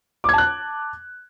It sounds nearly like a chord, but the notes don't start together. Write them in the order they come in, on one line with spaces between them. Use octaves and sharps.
D6 G#6 A5 F#6